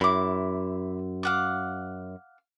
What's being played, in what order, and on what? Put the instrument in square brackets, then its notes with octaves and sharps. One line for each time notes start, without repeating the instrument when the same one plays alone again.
[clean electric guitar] F#2 [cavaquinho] E4 D6
[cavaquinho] F5 F#5 D6